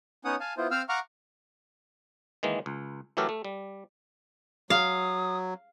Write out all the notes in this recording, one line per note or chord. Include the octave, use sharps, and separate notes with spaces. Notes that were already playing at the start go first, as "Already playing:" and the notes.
B3 C#4 D#4 C#5 F#5 D#6
F5 G#5 A5
B3 E4 F4 C5
C4 C5 F5 E6 F6
F5 F#5 A#5 C#6 D6 F6
D#3 E3 G#3 A#3
C#2
E3 F#3 A3 G4 A4 A#4
A3
G3
F#3 F5 D#6